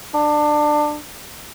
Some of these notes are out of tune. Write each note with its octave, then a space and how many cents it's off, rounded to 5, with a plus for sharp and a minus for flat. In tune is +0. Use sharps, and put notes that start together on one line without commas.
D4 +25